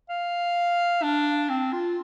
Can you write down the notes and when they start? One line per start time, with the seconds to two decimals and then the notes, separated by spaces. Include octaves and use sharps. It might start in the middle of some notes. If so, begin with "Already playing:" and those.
0.09 F5
1.03 D4
1.49 C4
1.73 F4